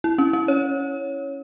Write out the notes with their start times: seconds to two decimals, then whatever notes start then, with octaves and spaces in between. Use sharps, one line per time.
0.04 E4
0.18 C#4
0.33 C#4
0.48 C#5